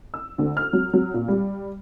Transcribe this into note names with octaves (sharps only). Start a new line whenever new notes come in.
E6
D2
F6
F#3
F#3
A#2
G3